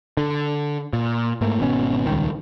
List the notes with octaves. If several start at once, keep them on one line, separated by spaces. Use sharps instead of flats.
D3
A#2
G#2 A3 A#3
G#1 B2 B3 C#4
D#1 G#1 C#2 D#3